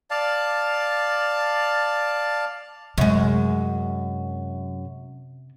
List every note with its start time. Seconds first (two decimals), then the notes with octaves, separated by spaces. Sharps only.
0.11 D5 F5 A5
2.98 F#2 C3 G#3